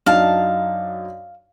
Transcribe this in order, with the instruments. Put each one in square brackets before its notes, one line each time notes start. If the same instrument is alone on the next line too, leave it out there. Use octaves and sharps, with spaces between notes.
[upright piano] F#2 D4 D#4 [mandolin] F5 A5